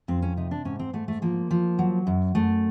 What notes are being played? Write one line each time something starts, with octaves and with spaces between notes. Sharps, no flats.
F2 C4
C#4
C3 D#4
D4
G#2 C#4
C4
G#2 A3
A3
F3 A#3
F3
F#3
F#2
F#2 A3